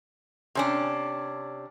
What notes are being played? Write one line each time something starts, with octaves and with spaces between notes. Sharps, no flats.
C3 C#4 D4